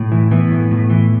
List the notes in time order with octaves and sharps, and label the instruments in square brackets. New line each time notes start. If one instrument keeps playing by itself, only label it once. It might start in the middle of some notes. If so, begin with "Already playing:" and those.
Already playing: [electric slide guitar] A2
E3
E3 B3
A2
A2
E3